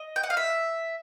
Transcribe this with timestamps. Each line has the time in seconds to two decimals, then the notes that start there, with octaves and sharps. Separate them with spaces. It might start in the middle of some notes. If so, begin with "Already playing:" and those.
Already playing: D#5
0.16 G5
0.23 F#5
0.30 F5
0.37 E5